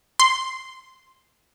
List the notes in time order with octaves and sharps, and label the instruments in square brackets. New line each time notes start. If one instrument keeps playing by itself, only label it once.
[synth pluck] C6